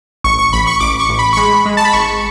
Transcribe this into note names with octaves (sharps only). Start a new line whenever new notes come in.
A1 C#6
C#6
A1 B5
C#6
A1 D6
C#6
A1
B5
C#6
G#3 B5
G#3
A5
B5
G#1 C#6